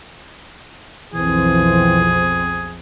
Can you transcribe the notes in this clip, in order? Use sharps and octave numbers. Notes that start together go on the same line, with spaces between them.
B1 F2 E3 C4 G#4